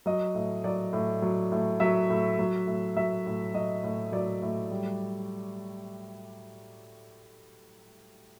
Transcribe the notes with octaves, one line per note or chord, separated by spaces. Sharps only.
F#3 D#5
A2
F#3 D5
A2
F#3
A2
F#3 E5
A2
F#3
A2
F#3 E5
A2
F#3 D#5
A2
F#3 D5
A2
G3